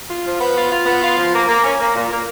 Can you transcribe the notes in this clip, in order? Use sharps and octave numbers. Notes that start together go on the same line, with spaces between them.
F4
F3
B3
F4
F4
B3
F4
F3
A#3
A#3
C#4
A#3
A#2
A#3